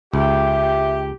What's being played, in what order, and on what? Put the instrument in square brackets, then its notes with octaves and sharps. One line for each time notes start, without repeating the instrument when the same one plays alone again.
[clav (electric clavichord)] C#2 [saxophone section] G4 [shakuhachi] E5